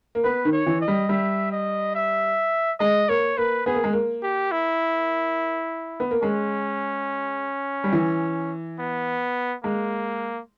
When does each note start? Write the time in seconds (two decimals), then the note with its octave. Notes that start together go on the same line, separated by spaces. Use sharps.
0.15 A#3
0.24 B3 B4
0.45 D#3
0.52 C#5
0.67 E3
0.81 D#5
0.88 G3
1.09 G3 E5
1.52 D#5
1.95 E5
2.80 G#3 D#5
3.09 A#3 C#5
3.37 A#3 B4
3.66 B3 G#4
3.75 A#3
3.84 G#3
3.93 A#3
4.23 G4
4.51 E4
6.00 B3
6.11 A#3
6.22 G#3 C#4
7.84 G3
7.93 E3
8.79 B3
9.64 G#3 A#3